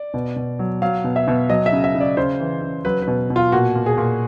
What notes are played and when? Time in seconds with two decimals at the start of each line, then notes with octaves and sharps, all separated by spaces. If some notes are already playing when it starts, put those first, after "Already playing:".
Already playing: D5
0.14 B2
0.36 B2
0.59 F#3
0.82 F#3 F5
1.04 B2
1.16 E5
1.28 B2
1.49 F#3 D#5
1.66 E5
1.72 C#3
1.84 E5
1.95 C#3
2.00 D5
2.17 C#3 C5
2.40 E3
2.62 C#3
2.85 F#3 B4
3.02 B4
3.08 B2
3.30 B2
3.36 F4
3.52 A#2 F#4
3.75 A#2
3.86 G#4
3.98 A#2